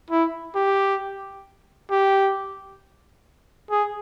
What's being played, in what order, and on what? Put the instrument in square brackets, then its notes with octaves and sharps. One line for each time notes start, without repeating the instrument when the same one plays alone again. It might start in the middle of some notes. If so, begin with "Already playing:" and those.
[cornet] E4
G4
G4
G#4